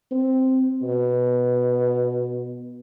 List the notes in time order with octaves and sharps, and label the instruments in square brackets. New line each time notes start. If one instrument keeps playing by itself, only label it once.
[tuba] C4
B2